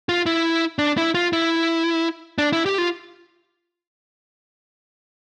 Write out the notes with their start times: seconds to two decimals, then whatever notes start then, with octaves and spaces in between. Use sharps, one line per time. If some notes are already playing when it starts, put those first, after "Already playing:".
0.09 F4
0.26 E4
0.79 D4
0.97 E4
1.15 F4
1.33 E4
2.38 D4
2.53 E4
2.66 G4
2.78 F4